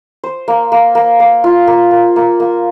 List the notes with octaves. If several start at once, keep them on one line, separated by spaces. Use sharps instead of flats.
C5
A#3
A#3
A#3
A#3
F4
A#3
A#3
A#3
A#3